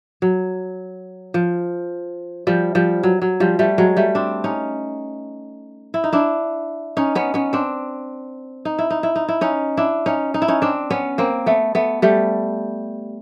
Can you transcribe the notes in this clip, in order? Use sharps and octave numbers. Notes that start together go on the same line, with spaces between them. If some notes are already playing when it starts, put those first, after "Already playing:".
F#3
F3
F3 G3
F3 G3
F#3
F#3
F3 G3
G3 A3
F#3 G#3
G3 A3
C4 D4
C#4 D#4
E4
D#4
D4 E4
C#4 D#4
B3 C#4
B3 C#4
C4 D4
D#4
E4
D#4
E4
D#4
E4
C#4 D#4
D4 E4
C#4 D#4
D#4
E4
C#4 D#4
C4 D4
B3 C#4
A#3 C4
A3 B3
A3 B3
G3 A3